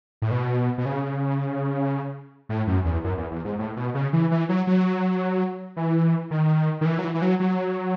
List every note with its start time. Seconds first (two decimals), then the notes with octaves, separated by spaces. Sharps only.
0.22 A2
0.31 B2
0.78 B2
0.86 C#3
2.49 A2
2.67 F#2
2.85 E2
3.04 F#2
3.17 E2
3.31 E2
3.45 G#2
3.59 A2
3.77 B2
3.95 C#3
4.13 E3
4.31 E3
4.49 F#3
4.67 F#3
5.77 E3
6.31 D#3
6.81 D#3
6.85 E3
6.99 F#3
7.04 E3
7.14 E3
7.22 F#3
7.40 F#3